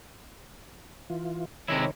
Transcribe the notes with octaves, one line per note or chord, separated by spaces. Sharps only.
E3 F4
C3 D#3 G#3 E4 C#5